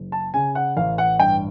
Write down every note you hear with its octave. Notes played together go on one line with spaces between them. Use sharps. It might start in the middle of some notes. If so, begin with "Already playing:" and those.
Already playing: F#1
A5
C#3 G#5
F#5
A1 F5
F#5
G2 G5